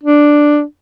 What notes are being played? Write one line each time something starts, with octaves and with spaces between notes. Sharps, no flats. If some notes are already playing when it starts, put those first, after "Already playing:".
D4